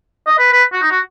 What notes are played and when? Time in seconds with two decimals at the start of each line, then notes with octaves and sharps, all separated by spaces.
0.27 D#5
0.38 B4
0.52 B4
0.73 F#4
0.82 D#4
0.91 F#4